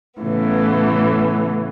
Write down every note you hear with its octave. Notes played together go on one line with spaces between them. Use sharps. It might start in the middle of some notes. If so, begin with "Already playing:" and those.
A2 C#3 E3 A3 B3